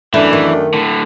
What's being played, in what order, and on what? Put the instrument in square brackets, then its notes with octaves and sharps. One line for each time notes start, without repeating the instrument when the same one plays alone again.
[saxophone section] F#2 A3 D4 [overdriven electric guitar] E3 [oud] E4
[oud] D#3
[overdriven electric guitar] A2 D3